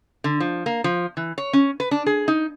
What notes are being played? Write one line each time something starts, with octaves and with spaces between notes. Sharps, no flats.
D3
F3
A#3
F3
E3
C#5
C#4
B4
D4
G#4
D#4